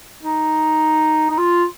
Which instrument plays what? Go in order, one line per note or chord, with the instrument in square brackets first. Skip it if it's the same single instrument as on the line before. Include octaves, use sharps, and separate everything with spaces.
[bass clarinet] D#4
D#4
F4